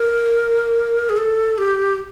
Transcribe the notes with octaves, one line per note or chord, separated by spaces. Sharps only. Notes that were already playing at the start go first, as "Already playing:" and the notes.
Already playing: A#4
G#4
A4
G4